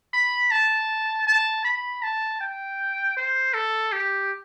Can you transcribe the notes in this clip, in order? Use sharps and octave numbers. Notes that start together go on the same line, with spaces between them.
B5
A5
A5
B5
A5
G5
C5
A4
G4